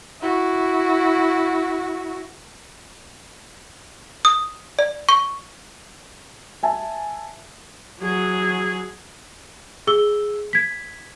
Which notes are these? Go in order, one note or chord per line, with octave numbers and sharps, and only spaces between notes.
E4 F#4
D#6
D5
C#6
E5 G#5 A5
F#3 G#4
G#4 E6 G7
G#6 B6